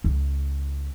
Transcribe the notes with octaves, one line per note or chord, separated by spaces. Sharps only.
C#2